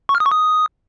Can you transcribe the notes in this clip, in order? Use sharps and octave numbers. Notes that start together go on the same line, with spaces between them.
C#6
F6
D#6
C#6
D#6